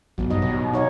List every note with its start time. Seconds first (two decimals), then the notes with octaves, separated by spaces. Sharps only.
0.18 A1 F#3 B3
0.30 G2 D#4 D#5
0.42 B2 G4
0.73 D#4 C#5 F5